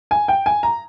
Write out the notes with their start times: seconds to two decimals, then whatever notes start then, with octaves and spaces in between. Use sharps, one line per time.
0.11 G#5
0.28 G5
0.46 G#5
0.63 A#5